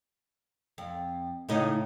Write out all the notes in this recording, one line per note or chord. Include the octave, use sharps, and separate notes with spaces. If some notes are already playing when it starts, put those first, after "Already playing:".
F2
A2 C#3 D#4